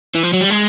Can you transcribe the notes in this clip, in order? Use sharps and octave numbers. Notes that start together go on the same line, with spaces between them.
E3
F3
F#3
G3
G#3